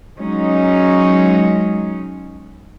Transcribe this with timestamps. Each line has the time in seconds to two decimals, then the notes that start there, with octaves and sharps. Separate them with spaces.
0.18 F#3 G#3 C#4 D#4